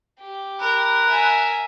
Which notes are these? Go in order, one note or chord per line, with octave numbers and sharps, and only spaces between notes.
G4
A#4 B5 F#6
E5 G#5